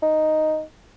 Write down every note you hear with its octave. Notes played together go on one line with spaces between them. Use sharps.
D#4